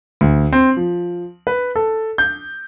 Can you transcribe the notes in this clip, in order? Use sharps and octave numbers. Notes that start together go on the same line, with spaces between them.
D2
C4
F3
B4
A4
G6